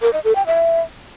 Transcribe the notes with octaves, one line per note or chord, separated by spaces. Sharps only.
A#4
D#5
A4
G5
E5